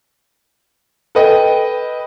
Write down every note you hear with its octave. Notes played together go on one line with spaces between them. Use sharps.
A4 B4 D#5 G5